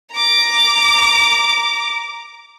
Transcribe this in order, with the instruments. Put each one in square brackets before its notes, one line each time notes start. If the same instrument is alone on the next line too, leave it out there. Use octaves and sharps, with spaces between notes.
[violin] A#5 D6